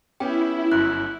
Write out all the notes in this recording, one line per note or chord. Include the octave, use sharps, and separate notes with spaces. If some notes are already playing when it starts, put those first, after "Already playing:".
B3 C#4 E4 G4 G5
G1 F#2 F#6